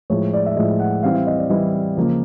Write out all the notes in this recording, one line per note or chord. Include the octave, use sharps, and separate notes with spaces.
A2 F3 G#3 C#5
D5
E5
A2 F3 G#3 D#5
F#5
E3 G3 C4 E4 F5
E5
D#5
D5
E3 G3 C4 E4 D#5
C#3 F3 A#3